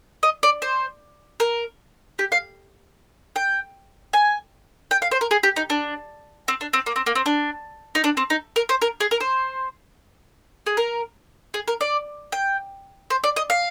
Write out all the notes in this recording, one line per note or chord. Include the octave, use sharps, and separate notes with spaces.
D#5
D5
C5
A#4
G4
F5
G5
G#5
G5
F5
C5
A#4
G#4
G4
D#4
D4
C4
D4
C4
A#3
C4
A#3
C4
D4
D#4
D4
C4
D#4
A#4
C5
A#4
G#4
A#4
C5
G#4
A#4
G#4
A#4
D5
G5
C5
D5
D#5
F5